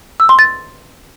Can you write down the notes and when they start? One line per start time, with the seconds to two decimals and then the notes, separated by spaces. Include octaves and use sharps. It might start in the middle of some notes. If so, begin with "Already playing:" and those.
0.20 E6
0.29 C6
0.39 A6